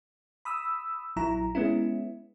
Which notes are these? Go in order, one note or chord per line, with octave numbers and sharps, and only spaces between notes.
B5 D#6 E6
A#1 F#3 E4 A#5
G#3 B3 C#4 E4